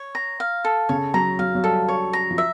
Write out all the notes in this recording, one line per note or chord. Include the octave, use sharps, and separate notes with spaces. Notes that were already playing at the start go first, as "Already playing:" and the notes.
Already playing: C#5
A#5
F5
A4
C#3 C#5
F#3 A#5
F#3 F5
F#3
G3 A4
C#5
A#5
F3
E5